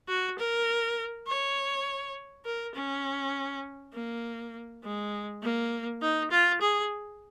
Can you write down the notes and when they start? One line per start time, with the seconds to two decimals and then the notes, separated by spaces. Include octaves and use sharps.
0.08 F#4
0.38 A#4
1.27 C#5
2.45 A#4
2.75 C#4
3.94 A#3
4.83 G#3
5.43 A#3
6.02 D#4
6.31 F4
6.61 G#4